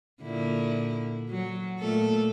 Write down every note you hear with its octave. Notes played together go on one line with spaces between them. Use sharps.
A#2 D3 E4
F#3
A#2 A3 A4